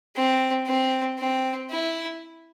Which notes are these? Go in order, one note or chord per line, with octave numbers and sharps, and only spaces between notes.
C4
C4
C4
E4